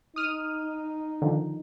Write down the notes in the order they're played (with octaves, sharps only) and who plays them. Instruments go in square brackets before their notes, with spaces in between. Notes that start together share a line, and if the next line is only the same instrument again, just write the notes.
[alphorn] D#4 [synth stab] D#6 F6 D#7
[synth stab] D3 D#3 F3